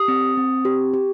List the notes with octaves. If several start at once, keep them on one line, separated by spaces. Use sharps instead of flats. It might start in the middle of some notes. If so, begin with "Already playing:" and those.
Already playing: G4 D#6
C4
C4
G4
G4